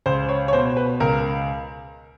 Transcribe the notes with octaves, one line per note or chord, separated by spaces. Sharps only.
C#2 C5
C#5
C#5
B2 C5
B4
C#2 A#4